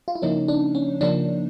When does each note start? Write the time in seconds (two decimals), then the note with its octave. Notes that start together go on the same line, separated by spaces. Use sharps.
0.08 F4
0.15 E4
0.22 C#3 F3 A#3 C#4 D#4
0.48 D4
0.75 C#4
1.01 C#3 F3 A#3 C#4 D4